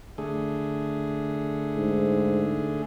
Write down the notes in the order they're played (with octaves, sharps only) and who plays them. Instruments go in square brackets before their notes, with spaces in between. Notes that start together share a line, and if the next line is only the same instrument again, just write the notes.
[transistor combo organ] D3 A3 G#4
[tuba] G#2